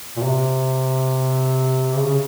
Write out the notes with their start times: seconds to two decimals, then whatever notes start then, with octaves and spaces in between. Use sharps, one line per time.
0.16 A#2
0.23 C3
1.95 C#3
2.07 C#3